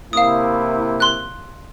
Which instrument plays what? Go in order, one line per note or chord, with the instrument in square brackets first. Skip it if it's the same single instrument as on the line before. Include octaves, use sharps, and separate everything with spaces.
[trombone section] C3 A#3 E4 [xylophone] F5 D#6
[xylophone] C6 F#6